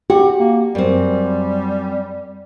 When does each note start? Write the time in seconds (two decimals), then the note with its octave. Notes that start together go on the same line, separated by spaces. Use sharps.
0.10 F#4 G4
0.39 A#3
0.75 F#2 G3 C4